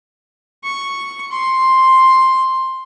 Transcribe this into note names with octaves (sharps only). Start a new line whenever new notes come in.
C#6
C6